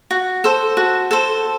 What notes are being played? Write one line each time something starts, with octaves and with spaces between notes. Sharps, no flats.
F#4
A4 C5
F#4
A4 C5